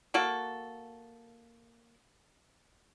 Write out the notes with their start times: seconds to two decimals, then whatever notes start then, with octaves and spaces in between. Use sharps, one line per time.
0.14 A#3 F#4 A4